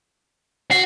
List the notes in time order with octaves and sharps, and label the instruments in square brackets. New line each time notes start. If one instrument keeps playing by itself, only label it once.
[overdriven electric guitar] F#4 [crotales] C7